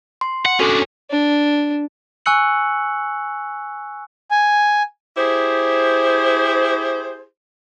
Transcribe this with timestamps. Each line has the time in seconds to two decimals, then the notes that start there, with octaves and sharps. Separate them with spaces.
0.21 C6
0.45 F#5
0.60 C#4 D4 F#4 A4
1.11 D4
2.26 G#5 C#6 E6 F#6 C#7 F#7
4.31 G#5
5.17 E4 G4 G#4 C5